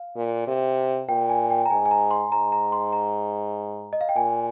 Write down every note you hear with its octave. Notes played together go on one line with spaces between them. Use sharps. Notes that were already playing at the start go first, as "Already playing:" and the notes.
Already playing: F5
A#2
C3
A#2 G5
G#5
G5
A#5
G#2 G#5
G#5
A#5
C6
G#2 A#5
A#5
C6
A#5
D#5
F5
G5
A#2 G#5